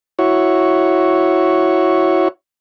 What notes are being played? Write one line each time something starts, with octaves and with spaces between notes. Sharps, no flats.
E4 F#4 C#5